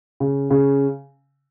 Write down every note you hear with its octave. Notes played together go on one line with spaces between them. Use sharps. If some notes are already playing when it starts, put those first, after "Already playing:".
C#3
C#3